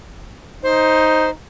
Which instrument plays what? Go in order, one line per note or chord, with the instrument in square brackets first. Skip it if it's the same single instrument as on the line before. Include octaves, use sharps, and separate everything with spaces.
[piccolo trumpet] D#4 [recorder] C5